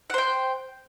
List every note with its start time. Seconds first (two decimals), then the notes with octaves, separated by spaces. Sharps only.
0.10 F#5
0.14 C5
0.18 G5